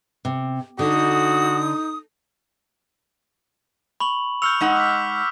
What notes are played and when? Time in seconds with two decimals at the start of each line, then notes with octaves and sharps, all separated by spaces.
0.25 C3
0.79 D3 D#4 F#4 D#6
4.00 B5 C#6 F#7
4.42 C#6 E6 F6 G6 C#7 F7
4.60 G#3 D#4 F#5
4.77 D6 B6